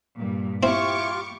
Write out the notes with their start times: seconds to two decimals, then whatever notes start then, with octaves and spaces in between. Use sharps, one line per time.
0.16 G2 A#2
0.63 C4 E4 F4 G4 C#6 D6